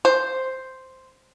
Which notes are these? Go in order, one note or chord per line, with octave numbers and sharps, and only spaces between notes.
C5